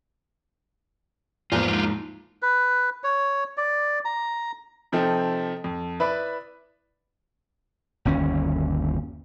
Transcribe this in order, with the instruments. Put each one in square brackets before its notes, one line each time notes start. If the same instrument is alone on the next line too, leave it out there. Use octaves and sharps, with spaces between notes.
[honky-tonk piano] E2 F3 A#3 [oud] G#2 [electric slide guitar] E4 F4
[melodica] B4
C#5
D5
A#5
[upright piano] C3 F3 C4 D#4 A4
F2
E4 B4 D5 E5 B5
[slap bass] G1 D#2 C#4